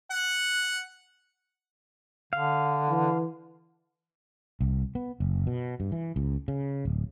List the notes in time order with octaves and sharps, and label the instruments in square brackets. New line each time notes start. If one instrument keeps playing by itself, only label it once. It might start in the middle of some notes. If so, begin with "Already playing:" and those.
[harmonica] F#5
[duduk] D3 [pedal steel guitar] F5
[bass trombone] E3
[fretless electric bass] C2
B3
F#1
B2
G2
E3
C#2
C#3
D1